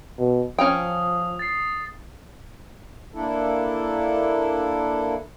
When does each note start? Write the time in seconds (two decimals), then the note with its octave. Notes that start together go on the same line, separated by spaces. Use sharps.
0.18 B2
0.58 F3 C#4 A#4 G5 D#6
1.39 A6 C7
3.14 A#3 D4 E4 A4